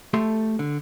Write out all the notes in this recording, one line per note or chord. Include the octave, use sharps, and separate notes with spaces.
A3 G4 A4 E5 C6
D3